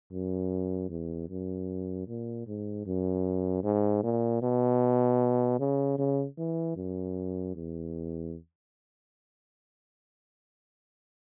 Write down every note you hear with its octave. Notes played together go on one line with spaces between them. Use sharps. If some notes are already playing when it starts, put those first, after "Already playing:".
F#2
E2
F#2
A#2
G#2
F#2
G#2
A#2
B2
C#3
C#3
E3
F#2
E2